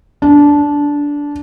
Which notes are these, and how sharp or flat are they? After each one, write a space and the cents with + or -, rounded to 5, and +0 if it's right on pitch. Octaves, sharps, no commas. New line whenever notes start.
D4 -15